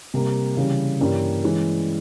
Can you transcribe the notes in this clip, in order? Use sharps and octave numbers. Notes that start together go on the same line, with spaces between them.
C3 G3 A#3
C#3 E3 G3
G2 E3 G3 A#3 C#4
E3 G#3 C#4